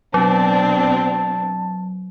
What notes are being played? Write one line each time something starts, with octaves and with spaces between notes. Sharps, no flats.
B2 F#3 C4 D4 A5